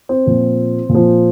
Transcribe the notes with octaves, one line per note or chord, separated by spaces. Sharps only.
C4
A#2 F3
A#2
F3